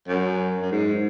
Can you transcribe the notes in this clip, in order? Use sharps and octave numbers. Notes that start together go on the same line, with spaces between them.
F#2
F#2
G#2